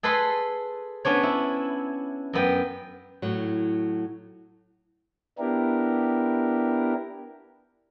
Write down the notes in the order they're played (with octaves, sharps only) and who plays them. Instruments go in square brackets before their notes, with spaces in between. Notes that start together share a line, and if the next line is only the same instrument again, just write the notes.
[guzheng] G#4 A4 B4 B5 C6
B3 C#4 D4 C#5
E4
F#2 B3 G5
[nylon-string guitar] A2 F#3
[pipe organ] B3 D4 E4 G4 A#4